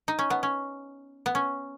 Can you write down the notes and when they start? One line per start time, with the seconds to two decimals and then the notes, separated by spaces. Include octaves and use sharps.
0.08 D#4
0.19 C#4
0.30 B3
0.43 C#4
1.26 B3
1.35 C#4